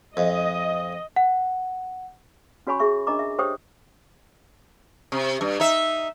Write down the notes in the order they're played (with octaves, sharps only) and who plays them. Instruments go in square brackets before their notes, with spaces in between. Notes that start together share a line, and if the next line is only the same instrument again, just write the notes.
[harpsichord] F2 [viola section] D#5
[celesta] F#5
[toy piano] C#4 F#4 C#5 G#5 B5 C#6
G#4 E5 C#6
D4 A#4 D#5 A#5 D6
E5
G4 C5 C#5 G5 C#6 D#6
[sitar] C3
G2
D#4 E5